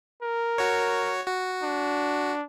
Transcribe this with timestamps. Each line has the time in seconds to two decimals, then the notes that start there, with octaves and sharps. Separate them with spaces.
0.22 A#4
0.58 F#4 C#5
1.27 F#4
1.63 D4